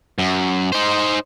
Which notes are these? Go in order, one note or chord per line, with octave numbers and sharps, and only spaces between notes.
F#2
D#4 C5